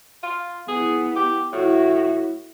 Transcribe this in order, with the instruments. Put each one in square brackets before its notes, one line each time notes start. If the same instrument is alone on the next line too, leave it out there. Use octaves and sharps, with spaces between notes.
[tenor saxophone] F4
[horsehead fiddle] B3 E4 [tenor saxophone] G#4
[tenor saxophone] G4
[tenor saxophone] A2 [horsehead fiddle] E4 F#4